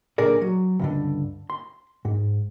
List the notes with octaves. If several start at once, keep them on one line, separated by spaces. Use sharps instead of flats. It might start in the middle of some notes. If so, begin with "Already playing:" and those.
B1 A#2 D3 G#4 A#4 D5
F#3
C#2 G2 D3
C6
G#2